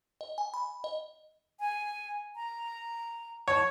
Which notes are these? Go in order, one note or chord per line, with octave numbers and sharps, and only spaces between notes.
D#5
G#5
B5
D#5
G#5
A#5
C#5 A5